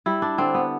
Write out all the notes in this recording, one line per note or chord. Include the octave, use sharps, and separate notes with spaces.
G3 E4
D4
D3 C4
B3